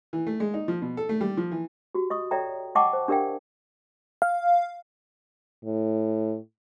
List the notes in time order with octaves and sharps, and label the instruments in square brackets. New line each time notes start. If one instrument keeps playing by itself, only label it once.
[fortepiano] E3
A3
G#3
D#4
F3
B2
A4
A3
G3
F3
E3
[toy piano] F#4 G4
D#5 C#6 D#6
A4 C#5 D5 E5 G5 A#5
D#5 F#5 G5 A5 C#6 D6
C5
D4 G4 A#4 D5 F5 G5
[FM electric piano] F5
[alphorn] A2